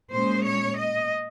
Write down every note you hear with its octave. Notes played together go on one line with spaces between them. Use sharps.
A#2 G#3 C#4 C5
C#5
D#5